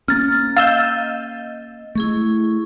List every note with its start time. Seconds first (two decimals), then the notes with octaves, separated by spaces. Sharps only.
0.08 A#3 C#4 A#5 F6 A6
0.56 D#5 F5 E6 G6 A6
1.95 A3 E4 G#4 C#6